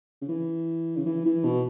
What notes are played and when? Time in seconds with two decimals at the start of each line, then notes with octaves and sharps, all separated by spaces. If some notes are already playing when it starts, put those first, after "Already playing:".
0.22 C#3
0.29 E3
0.97 C#3
1.06 E3
1.25 E3
1.44 B2